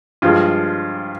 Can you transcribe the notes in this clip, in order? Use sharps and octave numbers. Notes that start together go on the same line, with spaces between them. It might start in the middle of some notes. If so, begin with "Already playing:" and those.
G2 F3 G#3 F4